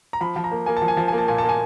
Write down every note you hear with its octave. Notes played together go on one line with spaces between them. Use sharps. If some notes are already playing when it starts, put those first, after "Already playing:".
A#5
F3 B5
F3
A#5
A#3
A#3 G#5
A5
F3
G#5
F3 A5
A#3 G#5
A5
A#2 G#5
A#3 A5
G#5